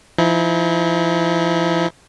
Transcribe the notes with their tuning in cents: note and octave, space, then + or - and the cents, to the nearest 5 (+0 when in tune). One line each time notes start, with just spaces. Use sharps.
F3 -40 E4 -45